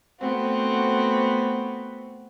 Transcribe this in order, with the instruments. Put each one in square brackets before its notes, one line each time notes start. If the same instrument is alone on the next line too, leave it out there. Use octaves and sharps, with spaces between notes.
[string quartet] A3 B3 C4 F#4